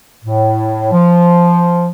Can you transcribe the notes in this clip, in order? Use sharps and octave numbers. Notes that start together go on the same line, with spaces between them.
A2
F3